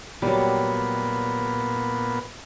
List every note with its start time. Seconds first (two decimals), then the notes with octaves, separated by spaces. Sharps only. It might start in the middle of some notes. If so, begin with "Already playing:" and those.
0.22 A#2 F#3 G3 B3